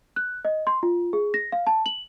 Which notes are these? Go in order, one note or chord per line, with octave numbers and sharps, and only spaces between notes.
F#6
D#5
C6
F4
G#4
A#6
F5
A5
F#7